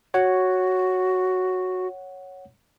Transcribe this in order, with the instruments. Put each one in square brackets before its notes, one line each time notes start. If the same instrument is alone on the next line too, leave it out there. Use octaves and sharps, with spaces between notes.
[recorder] F#4 [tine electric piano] C#5 F#5